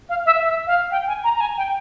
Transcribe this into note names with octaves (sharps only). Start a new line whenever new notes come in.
F5
E5
E5
F5
G5
G#5
A#5
A#5
G#5
G5